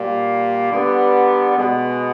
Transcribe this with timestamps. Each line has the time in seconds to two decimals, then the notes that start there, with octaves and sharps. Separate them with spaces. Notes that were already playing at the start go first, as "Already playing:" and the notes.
Already playing: A#2 G3 A#3
0.71 D3 G3 B3
1.57 B2 G#3 B3